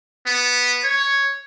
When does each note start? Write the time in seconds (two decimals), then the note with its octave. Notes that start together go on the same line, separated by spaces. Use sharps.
0.26 B3
0.84 C#5